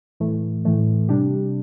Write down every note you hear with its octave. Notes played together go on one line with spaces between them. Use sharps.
A2 E3 A3
A2 E3 A3
C3 G3 D4 G4